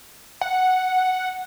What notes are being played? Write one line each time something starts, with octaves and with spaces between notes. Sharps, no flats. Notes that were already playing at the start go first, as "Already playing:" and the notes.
F#5